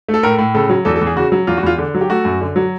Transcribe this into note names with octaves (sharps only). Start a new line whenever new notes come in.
A3
A4
A2 A#4
A2
C#3 A4
F#3
E2 A4
A4
E2
G#4
C#3 F#4
F#3
E2 F4
F#4
E2 F4
D3
F#3
G4
A3 F#4
F#2
D3
F#3